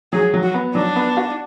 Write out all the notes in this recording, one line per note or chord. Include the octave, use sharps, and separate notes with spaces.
F#3 G#4
F#3
F#4
B3
F#3 D4
B3
F#4